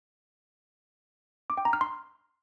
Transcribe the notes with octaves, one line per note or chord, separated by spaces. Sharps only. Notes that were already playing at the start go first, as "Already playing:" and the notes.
D6
G5
A#5
F6
C6